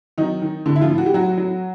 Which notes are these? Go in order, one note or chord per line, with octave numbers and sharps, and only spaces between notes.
D#3 F#3 D#4
D#3
A2 D3 D4
E4
F3 F4
A2
F#4
G4
F#3 F#4
F#3